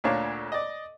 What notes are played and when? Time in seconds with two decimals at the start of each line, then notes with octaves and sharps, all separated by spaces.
0.04 D2 A#2 D4 C#5 F5
0.52 D5 D#5